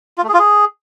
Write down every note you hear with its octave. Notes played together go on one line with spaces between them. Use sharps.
F4
A3
G#4
F4
G#4